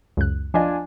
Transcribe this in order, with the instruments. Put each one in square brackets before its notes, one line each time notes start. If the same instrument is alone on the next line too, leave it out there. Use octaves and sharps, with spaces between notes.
[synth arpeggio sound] C#2 F#2 F#6
[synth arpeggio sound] F3 D#5 [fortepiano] D4 F4 G#5